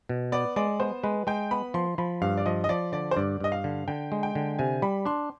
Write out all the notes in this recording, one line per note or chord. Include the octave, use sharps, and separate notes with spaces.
B2
B3 D5
G#3 D5
B3 C5
G#3 B4
G#3 G5
B3 B5
F3 C6
F3 B5
G2 F5
D5
F3 D#5
D#5
F3 D5
D3 D5
C5
G2 D5
G2 D#5
F5
D3
D3 G5
G#3
G5
D3
C3 G#5
G3 B5
D4 C6